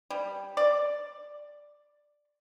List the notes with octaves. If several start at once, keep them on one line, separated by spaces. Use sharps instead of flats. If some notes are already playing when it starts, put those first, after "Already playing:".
G3
D5